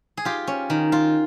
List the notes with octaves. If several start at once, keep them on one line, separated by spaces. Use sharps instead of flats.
G#4
F4 G4
C#4
D#3
F4